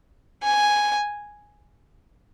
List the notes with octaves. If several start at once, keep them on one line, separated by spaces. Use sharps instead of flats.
G#5